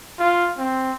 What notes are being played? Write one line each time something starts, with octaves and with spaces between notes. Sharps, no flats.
F4
C4